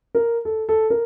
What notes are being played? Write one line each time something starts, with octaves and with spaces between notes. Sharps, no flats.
A#4
A4
A4
A#4